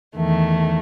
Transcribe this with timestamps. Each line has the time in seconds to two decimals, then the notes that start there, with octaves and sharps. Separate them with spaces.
0.16 E2 D#3 A3